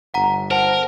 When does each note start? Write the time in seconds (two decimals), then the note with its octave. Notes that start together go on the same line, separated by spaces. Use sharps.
0.14 G1 F#5 A#5
0.51 A#4 C5 F#5 A5 D7